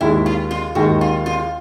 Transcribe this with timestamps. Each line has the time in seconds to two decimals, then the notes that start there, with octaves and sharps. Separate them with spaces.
0.01 D#2 D#3 G#3 E4
0.26 F4
0.51 F4
0.75 D#2 D#3 G#3 F#4
1.01 F4
1.26 F4